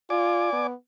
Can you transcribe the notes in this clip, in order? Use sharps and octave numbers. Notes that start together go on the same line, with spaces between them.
F4 D5 G#5 D6
B3